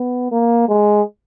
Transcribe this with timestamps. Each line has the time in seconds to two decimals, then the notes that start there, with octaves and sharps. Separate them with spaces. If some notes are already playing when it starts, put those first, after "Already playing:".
Already playing: B3
0.31 A#3
0.68 G#3